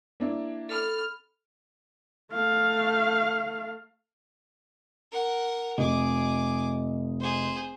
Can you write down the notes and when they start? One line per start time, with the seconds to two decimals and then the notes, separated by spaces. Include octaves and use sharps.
0.20 A#3 D4 E4
0.69 A4 B5 F6
2.32 A3 F5
5.12 A#4 F#5
5.78 F1 G#4 D#5 D6
7.20 G#4 C5